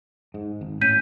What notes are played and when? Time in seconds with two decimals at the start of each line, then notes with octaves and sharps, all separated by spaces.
0.34 G#2
0.61 G#1
0.81 A2 C#4 G6 B6 D#7